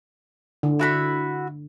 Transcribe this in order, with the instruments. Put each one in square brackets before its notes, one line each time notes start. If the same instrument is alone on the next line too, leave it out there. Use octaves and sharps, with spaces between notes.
[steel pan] D3
[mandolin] E4 F#4 B5